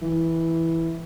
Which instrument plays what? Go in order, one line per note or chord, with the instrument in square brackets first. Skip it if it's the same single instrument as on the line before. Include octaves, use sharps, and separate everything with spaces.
[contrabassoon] E3